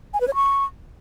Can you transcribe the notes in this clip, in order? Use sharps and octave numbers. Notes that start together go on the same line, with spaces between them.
G#5
B4
C#5
C#6